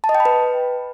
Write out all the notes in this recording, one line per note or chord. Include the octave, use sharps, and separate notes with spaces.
A5
D#5
G5
B5
B4